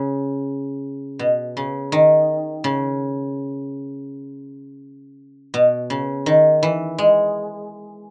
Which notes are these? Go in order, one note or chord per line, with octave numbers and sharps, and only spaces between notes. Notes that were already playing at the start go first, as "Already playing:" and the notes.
Already playing: C#3
B2
C#3
D#3
C#3
B2
C#3
D#3
E3
G#3